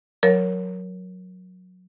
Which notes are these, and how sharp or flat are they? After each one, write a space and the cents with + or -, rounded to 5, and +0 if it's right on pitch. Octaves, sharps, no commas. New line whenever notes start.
F#3 -15 A#4 +0 C#5 +0